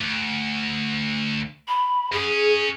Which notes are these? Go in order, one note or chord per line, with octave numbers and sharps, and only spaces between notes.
D2
B5
F#2 C#4 G#4